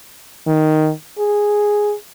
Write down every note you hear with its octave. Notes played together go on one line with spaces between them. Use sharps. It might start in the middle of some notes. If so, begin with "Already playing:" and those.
D#3
G#4